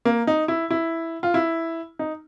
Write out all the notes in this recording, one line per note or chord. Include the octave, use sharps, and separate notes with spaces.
A#3
D#4
E4
E4
F4
E4
D#4